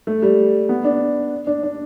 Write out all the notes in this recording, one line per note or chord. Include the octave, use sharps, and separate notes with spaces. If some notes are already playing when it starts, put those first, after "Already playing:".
A3
G3
B3
D4
D4
D4